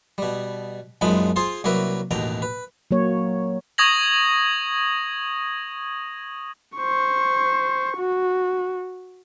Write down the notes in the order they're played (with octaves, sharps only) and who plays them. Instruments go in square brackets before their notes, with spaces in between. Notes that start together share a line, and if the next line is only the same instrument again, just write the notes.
[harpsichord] B2 G3
A#1 F#2 F3 G#3 D#4 B5
F4 G#4 C5 C6
C2 F#3 A#3 A#4 B4 E5
A1 D#2 B2 G5 A#5
B4
[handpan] F#3 A#3 C#5
[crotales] C#6 D#6 G#6 A#6 F#7
[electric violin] C5 C#6
F#4